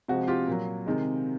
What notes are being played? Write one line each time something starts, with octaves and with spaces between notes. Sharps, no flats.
C3 F3 G#3 F#4
F4 G4
A#2 F#3
C3 D#3 G#3